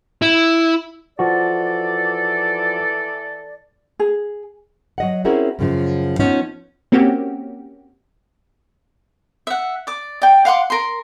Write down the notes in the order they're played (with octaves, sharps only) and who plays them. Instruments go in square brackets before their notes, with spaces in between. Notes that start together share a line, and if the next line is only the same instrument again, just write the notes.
[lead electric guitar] E4
[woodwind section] E3 A4 D5 [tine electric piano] F3 F#4
[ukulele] G#4
[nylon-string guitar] F#3 D#5 F#5
C4 C#4 E4 F#4 G#4 A#4
F#2 C#3 F3
F3 B3 C#4 D#4
[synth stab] A#3 C4 C#4 F#4 G4
[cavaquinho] E5 F#5
D5 D6
D5 G5
F5 F#5 C6 D6
A#4 C6